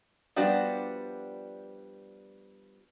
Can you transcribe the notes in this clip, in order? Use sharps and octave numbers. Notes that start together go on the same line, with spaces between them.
F3 G3 B3 D4 F#4